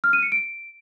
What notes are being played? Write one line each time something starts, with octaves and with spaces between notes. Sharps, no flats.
F6
D#7
C#7
D7